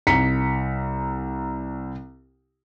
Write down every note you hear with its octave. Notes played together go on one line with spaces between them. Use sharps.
C2 A#5 B6 C#7